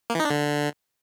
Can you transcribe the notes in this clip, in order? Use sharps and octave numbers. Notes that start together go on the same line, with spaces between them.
A#3
E3
D#4
D4
D3